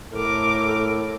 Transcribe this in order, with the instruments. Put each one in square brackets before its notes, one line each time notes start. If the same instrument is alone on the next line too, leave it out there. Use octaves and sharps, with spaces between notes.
[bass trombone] A2 [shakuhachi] A4 [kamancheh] A#4 D6